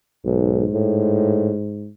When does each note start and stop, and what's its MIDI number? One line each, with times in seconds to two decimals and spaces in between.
0.25 0.64 35
0.25 1.88 44
0.74 1.51 45